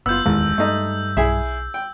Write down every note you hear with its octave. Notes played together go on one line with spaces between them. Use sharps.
F#1 B3 F4 E6 G6
D1 A1 E2 D#3 G#3
G2 A3 D#4
B1 E4 G#4 E5
G5